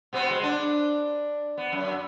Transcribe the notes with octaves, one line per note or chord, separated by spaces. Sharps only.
B2 B3 C4
G#3
D4
B3
F#2